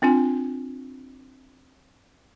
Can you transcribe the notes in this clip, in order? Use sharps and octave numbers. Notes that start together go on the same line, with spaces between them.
C4 D4 F4 G#5